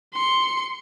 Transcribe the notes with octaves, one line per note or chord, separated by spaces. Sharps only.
C6 C#7